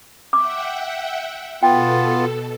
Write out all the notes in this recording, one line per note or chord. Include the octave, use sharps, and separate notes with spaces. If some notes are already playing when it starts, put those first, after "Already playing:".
E5 F#5 G5 D6
B2 B3 F4 A4 G5